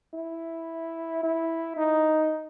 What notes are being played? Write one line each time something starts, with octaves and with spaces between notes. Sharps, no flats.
E4
E4
D#4